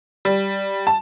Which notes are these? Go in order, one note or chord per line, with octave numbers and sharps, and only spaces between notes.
G3
A5